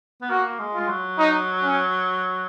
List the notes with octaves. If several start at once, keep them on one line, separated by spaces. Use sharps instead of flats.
B3
A#3 F#4
G#3
G#3 F4
F#3
D#4
C#4